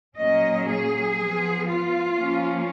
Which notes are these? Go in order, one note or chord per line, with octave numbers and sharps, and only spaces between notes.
A#2 F#3 A#3 C#4 D#5
G#4
F3 B3
F4
F3 A#3 C#4